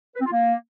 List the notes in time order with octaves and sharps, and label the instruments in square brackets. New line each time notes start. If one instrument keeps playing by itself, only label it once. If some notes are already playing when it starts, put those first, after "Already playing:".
[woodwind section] B4
C4
F4
A#3